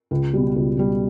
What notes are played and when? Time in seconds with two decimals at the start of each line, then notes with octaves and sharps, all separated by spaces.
0.11 C#2
0.33 B2 G3
0.56 C#2
0.77 B2 G3